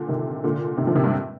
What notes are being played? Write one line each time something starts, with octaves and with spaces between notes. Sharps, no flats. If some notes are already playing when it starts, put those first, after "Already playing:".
Already playing: A#2 D3
C3 D#3
A#2 D3
C3 D#3
D3 F3
C3 D#3
G2